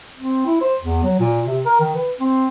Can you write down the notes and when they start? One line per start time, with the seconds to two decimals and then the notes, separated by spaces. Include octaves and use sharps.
0.18 C4
0.46 E4
0.61 C5
0.82 E2
1.04 F#3
1.20 A#2
1.46 C3
1.65 A#4
1.80 D#3
1.95 B4
2.20 C4